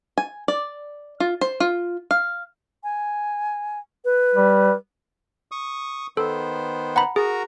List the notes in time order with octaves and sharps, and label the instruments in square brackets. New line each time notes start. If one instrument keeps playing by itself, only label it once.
[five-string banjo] G#5
D5
F4
C5
F4
F5
[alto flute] G#5
B4
[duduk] G3
[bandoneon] C#6 D#6
[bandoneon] D#3 B3 C5 [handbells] A4
[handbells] F#5 A#5 B5
[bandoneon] F#4 A#4 A#5 [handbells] G#4